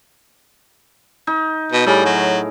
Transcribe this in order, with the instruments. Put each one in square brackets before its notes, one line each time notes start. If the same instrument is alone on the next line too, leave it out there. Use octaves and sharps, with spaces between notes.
[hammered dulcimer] D#4
[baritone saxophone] B2
[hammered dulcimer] A2 G#4 A#4 [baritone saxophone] G3
[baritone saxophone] F#3